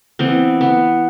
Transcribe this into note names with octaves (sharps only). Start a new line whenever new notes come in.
E3 B3 C4
B3